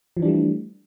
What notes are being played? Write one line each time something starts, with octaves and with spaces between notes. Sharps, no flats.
E3 F3 G3 A3 D4